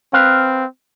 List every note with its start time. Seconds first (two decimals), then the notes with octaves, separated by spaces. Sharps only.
0.13 C4 B4 F5